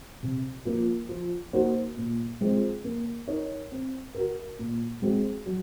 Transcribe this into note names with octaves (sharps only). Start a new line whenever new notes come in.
C3
F3 A#3 F4
F3
A#3 D#4 F#4 C5
A#2
G#3 C4 F4 C5
A#3
D#4 A#4 C#5
C4
F#4 A#4
A#2
G#3 C4 F#4
F#3